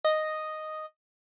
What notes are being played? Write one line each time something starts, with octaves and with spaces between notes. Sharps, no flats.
D#5